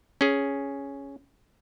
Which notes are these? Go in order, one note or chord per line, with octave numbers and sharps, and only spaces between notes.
C#4 G#4